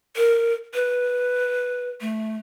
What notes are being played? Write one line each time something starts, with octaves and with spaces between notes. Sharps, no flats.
A#4
B4
A3